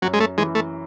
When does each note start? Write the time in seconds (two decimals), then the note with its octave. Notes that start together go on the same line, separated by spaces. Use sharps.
0.02 F#2 F#3
0.13 G#3
0.20 A3
0.38 E3 G#3
0.55 A3